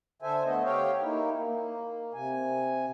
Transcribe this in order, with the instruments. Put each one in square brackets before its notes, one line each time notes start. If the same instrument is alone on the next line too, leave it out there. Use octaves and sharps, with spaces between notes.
[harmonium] D3 A4 C5 E5 G#5
A3 B3 D#5
G4 C#5 F5 G5
A#3 D#4 E4
A#3
C3 G#5